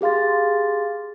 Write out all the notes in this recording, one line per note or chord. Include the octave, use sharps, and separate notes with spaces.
G4 G#4 F5 C6 A6